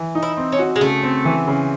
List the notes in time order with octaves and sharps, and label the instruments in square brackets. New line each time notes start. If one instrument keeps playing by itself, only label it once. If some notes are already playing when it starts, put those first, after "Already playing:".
Already playing: [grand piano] E3
D#4
[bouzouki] E4
[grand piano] C4
[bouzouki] C#4
[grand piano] F#4
[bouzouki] G#3
[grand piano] C#3 [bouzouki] A3
[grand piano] C4
E3
C#3